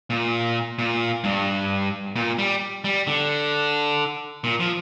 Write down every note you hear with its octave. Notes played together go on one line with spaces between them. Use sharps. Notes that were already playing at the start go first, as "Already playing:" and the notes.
A#2
A#2
G2
A#2
G3
G3
D3
A#2
F3